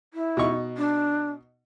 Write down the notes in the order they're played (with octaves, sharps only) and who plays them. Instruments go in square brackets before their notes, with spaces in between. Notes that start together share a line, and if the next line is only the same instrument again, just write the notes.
[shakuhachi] E4
[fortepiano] B2 D#4 C#6
[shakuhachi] D4